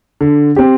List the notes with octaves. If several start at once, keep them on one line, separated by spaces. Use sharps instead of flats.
D3
C4 G4